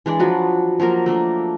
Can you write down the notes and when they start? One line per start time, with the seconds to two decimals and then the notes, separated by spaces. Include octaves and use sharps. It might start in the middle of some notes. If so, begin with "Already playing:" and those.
0.06 E3 G#3 D4 D5
0.19 F3 F#3 F#4 B4
0.80 F3 F#3 A#3 A#4
1.06 A3 A#3 D4 A#4